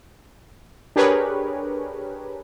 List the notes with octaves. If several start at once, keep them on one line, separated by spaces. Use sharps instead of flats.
D4 G4 G#4 A#4 B4 C#5